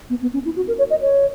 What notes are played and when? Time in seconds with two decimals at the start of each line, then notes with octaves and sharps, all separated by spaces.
0.10 B3
0.22 B3
0.34 C#4
0.45 E4
0.56 F#4
0.68 A#4
0.78 C#5
0.90 D#5
1.01 C#5